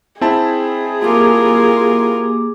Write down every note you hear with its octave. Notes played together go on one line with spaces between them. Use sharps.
C4 E4 G#4 A5
A#3 F4 G4 A#4 D6